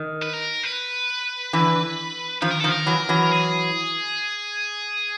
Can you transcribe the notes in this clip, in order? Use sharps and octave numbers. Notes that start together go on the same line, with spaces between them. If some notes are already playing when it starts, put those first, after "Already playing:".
Already playing: D#3
B4
A#4
B4
D3 E3
D#3 F3 B4
A#4
D#3 F3 A4
A#4
E3 F#3
E3 F#3
G#4